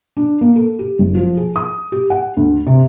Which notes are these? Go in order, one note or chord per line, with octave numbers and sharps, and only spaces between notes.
D4
A#3
A4
G4
F#1
F3
G#4
D#6
G4
F#5
D2
C3